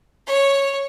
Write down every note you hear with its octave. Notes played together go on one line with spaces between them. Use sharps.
C#5